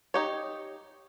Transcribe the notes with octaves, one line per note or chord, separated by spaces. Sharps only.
D#4 G4 C#5